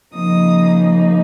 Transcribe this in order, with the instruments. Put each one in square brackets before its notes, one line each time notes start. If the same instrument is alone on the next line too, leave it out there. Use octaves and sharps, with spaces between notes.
[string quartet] C#3 F3 A#3 D#4 D#6